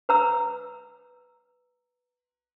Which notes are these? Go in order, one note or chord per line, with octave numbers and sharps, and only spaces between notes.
B4 A#5 E6